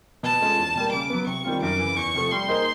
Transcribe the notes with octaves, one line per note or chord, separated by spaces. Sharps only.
B2 A5
G#3 C#4 F4 A4
E2
B2 G3 A#3
C#3 D6
F#3 B3
C3 C#6
D#3 G3 C4 F4
F#2 D6
C#3 E3
E2 C#6
C3 F3 A3
G3 C6
A#3 D#4 G#4 C5